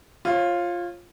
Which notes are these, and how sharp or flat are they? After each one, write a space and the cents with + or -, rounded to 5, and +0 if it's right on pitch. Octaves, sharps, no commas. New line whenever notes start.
F4 +0 C#5 -35